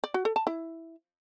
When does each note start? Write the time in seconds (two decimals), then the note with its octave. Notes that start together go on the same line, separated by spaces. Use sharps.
0.04 D5
0.14 F#4
0.25 A4
0.36 A5
0.47 E4